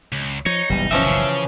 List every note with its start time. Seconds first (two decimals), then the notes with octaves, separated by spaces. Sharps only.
0.12 C#2
0.46 F3 D#4 C#5
0.70 F#1 B1 E2 A#2 G3
0.91 E3 F3 C#4 E5
1.05 C#3